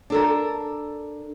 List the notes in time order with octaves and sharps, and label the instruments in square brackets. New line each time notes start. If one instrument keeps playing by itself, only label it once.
[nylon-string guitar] D4 A4 A#4